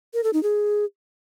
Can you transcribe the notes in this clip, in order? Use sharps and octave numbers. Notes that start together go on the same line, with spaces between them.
A#4
A4
D#4
G#4